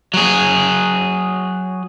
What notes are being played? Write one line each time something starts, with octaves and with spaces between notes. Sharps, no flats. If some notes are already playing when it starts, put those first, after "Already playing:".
F#3 G#4